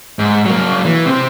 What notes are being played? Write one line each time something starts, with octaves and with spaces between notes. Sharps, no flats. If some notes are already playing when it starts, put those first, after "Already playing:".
G#2
F#3 A#3
E3
C3 C4